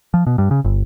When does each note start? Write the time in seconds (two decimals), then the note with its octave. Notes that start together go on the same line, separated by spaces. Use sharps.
0.14 F3
0.27 B2
0.38 G2
0.51 C#3
0.65 G1